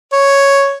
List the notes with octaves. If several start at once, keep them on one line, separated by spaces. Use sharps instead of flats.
C#5